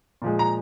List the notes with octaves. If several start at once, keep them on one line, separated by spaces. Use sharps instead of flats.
A#2 F3 G#3
A#5